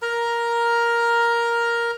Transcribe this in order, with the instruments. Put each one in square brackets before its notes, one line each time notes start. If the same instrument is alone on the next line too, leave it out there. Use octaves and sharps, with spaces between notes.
[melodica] A#4 A#5